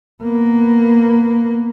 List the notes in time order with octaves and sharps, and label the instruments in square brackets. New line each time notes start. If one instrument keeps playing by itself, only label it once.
[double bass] A#3 B3